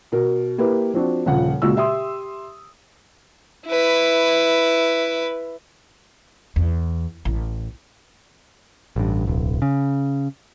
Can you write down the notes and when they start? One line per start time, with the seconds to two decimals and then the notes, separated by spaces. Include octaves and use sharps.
0.12 B2 A#4
0.58 A#3 E4 G4 A#4 B4
0.94 F3 C4 D4 F#4
1.26 D#1 C#3 F3 F#5
1.62 A#2 C#3 G#3 F#4 E6
1.76 G4 E5 C6 D#6
3.67 E4 B4
6.56 E2
7.25 A1
8.96 A1 G2
9.27 D1 B1
9.62 C#3